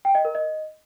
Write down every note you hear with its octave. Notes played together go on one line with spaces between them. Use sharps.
G5
D#5
A#4
D#5